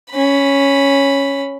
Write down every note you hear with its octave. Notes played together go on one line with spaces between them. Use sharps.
C#4 B5